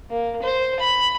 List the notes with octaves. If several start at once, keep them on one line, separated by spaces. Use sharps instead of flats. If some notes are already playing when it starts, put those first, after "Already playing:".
A#3
C5
B5